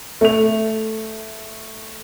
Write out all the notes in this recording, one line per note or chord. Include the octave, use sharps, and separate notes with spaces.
A3 F7